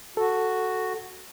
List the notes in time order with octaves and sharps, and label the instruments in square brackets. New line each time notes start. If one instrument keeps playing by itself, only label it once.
[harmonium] F#4 [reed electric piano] A4